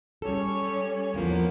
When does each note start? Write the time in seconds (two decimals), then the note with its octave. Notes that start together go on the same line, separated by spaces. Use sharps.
0.22 G3 C#4 A4 C#5
1.14 E2 F3 A#3 B3